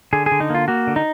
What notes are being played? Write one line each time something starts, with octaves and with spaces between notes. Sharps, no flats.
D3 G#4
G#4
D3
D#4
A#3 F4
A#3 F#4
D3
D#4